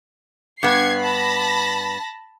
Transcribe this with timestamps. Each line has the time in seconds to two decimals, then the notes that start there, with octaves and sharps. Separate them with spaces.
0.63 G2 B3 C#6 G#6 C7
1.01 A5 B5 A#6